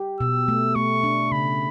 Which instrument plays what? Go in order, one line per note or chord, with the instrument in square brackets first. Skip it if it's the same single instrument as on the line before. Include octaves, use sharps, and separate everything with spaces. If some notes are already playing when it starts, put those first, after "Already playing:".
Already playing: [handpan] G4
[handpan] B2 [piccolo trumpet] E6
[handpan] A3
[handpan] A3 [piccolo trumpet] C#6
[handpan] D4
[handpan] C#3 [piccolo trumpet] B5